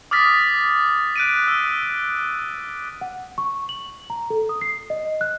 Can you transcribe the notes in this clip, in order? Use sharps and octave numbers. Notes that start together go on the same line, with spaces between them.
D6 D#6 F6 A6 B6
F#6 D7 D#7
E6
F#5
C#6
F#7
A#5
A4
D#6
C7
D#5
F#6